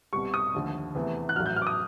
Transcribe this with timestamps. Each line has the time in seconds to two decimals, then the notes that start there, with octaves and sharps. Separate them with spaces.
0.13 C2 B2 G3 C#6
0.34 D#6
0.54 D#2 D3 F3 A3
0.95 E2 C3 E3 A3
1.29 F#6
1.36 A1 A2 F#3 F6
1.46 G6
1.56 F6
1.62 D6
1.67 D#6